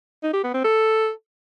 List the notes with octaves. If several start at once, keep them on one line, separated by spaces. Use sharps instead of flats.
D#4
G4
B3
C4
A4